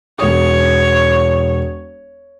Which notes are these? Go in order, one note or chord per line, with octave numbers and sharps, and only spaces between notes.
E1 C#5 D#6